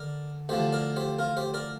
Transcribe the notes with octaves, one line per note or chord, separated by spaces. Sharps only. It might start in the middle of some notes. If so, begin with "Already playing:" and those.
Already playing: D3 A#4 D5
D2 D3 F3 G4 C5
A#4 D5
G4 C5
F4 A#4
G4 C5
A#4 D5